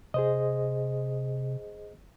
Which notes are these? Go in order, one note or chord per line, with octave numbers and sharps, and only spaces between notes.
C3 G#4 C5 D#5